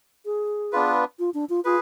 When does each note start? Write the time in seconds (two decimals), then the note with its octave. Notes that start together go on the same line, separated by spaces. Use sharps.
0.25 G#4
0.72 B3 D4 F4 B4
1.19 F4
1.34 D4
1.49 F4
1.65 F4 G#4 B4